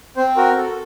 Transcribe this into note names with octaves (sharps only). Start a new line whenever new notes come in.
C4 C5
F#4 A#4
A4